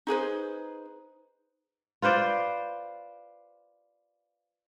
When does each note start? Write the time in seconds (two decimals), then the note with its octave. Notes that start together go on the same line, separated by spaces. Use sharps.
0.07 D#4 G#4 B4 C5
2.02 F4 B4 C5 D5